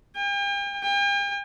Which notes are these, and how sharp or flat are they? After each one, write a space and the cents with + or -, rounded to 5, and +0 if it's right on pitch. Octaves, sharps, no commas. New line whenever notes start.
G5 +45
G5 +45